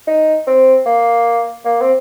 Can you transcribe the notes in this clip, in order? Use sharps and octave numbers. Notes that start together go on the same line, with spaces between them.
D#4
C4
A#3
A#3
C4